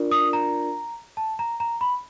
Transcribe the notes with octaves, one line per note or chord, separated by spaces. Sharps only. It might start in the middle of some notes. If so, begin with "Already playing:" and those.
Already playing: D4 F4 A#4 D5
D#6
A#5
A5
A#5
A#5
B5